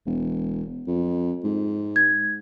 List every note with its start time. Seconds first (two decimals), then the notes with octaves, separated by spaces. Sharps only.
0.06 E1
0.88 F2
1.44 G#2
1.96 G#6